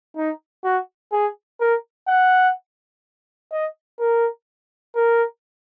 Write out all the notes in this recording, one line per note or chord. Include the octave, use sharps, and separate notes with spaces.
D#4
F#4
G#4
A#4
F#5
D#5
A#4
A#4